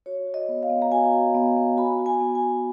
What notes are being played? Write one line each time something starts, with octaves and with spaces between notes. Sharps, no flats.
F#4 C#5
F#4
D#5
B3
F5
B3
A#5
F#4 G#5
F#4
B3
B3
F#4 B5
F#4
G#5
B3
G#5
B3